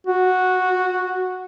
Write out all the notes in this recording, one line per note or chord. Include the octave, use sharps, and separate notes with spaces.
F#4